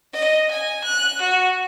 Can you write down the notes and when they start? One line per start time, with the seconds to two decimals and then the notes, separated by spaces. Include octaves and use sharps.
0.12 D#5
0.50 G#5
0.84 F#6
1.21 F#4